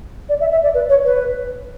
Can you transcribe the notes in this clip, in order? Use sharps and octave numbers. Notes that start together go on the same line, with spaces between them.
D5
E5
E5
D5
B4
C#5
B4